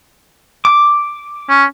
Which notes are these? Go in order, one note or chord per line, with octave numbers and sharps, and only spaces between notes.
D6
C#4